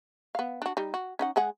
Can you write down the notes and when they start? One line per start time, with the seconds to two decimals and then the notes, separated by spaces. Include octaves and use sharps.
0.35 B3 F5
0.62 D4 F#4
0.77 G3 D#4
0.94 F#4
1.19 C#4 D#4 F#5
1.36 G#3 G#4 F#5